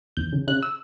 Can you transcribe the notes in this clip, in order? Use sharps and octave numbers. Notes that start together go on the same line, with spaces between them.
E2 G6
C#3
C#3 F#6
E6